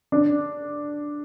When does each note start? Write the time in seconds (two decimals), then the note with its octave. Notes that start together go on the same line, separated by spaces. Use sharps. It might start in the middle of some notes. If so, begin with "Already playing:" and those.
0.12 D4